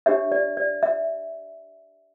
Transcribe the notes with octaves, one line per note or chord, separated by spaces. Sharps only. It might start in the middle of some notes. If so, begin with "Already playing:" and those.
D4 G4 C#5 E5
D5
D5
E5